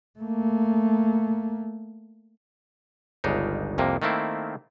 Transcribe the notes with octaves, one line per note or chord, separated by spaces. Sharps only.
A3 A#3
G1 C#2 C#3 D4 D#4
C2 F2 C3 A#3
D#3 A3 A#3 C4 E4